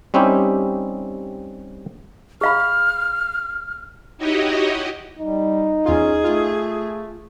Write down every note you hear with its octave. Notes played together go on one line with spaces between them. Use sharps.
G3 C4 C#4 D#4 E4 G4
G#4 F5 B5 F6
D#4 E4 F#4 G4 C#5 D#5
G3 D#4
E2 C#4 F4 G#4
A3 F4